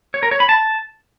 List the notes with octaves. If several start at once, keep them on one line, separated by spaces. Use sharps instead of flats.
C#5
A#4
C#5
B5
A5